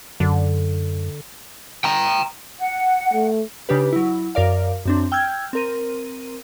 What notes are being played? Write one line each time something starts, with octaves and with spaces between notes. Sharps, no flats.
F#2 D3
G5 A#5
F#5
A3
C#3 D4 D#4 G4 B4
F#3 E4
F#2 A#4 D5 F5
F#2 C4 D4
G5 E6 F6 G6 G#6
C4 A#4 D#7